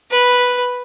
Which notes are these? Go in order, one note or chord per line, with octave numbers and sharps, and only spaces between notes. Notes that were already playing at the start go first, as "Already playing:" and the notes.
B4